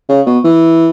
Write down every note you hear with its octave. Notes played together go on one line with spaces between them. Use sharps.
C#3
B2
E3